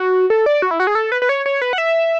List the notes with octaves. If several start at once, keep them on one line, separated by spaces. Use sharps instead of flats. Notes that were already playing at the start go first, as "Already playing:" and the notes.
Already playing: F#4
A4
D5
F#4
E4
F#4
G#4
A4
B4
B4
C#5
C#5
B4
F#5
E5